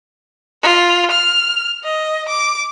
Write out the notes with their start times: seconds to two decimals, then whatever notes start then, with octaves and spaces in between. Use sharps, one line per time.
0.63 F4
1.11 F6
1.84 D#5
2.29 D6